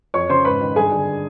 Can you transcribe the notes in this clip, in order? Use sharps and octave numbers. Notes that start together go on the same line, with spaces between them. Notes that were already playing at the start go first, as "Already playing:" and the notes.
F2 C#5 C#6
C#3 C5 C6
G#2 B4 B5
D#3
G2 G#4 G#5
D3